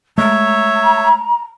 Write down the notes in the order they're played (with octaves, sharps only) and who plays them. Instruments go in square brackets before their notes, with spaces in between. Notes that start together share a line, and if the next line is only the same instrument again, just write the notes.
[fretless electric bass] G#3 A3 [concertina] C#5 E5 [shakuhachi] A#5